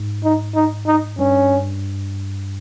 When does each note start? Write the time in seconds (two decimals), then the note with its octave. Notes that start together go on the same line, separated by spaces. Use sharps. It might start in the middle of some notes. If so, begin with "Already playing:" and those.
Already playing: G#2
0.24 D#4
0.55 D#4
0.87 D#4
1.19 G2 C#4